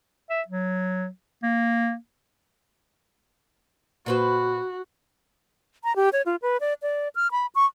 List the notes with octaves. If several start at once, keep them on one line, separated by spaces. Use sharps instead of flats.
E5
F#3
A#3
A#2 F#4 B4 C5
A#5
G4
C#5
F4
B4
D5
D5
F6
B5
C#6